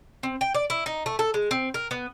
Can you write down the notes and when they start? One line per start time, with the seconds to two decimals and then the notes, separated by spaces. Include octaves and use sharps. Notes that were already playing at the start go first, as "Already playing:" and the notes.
0.23 C4
0.41 G5
0.54 D5
0.70 E4
0.86 D#4
1.06 A3
1.19 A4
1.34 G#3
1.51 C4
1.74 A#4
1.91 B3